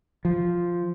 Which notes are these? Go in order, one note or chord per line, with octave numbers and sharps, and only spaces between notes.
F3